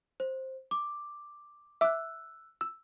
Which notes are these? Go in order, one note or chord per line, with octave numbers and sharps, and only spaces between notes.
C5
D6
E5 D6 E6 F#6
E6